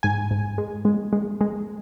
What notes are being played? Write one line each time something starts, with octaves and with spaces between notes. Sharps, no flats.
G#2 G#5
G#2
G#3
G#3
G#3
G#3